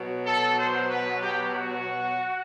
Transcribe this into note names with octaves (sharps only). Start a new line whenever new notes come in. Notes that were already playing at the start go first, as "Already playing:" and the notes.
Already playing: B2 F#3
A4
C5
B4
G4
F#4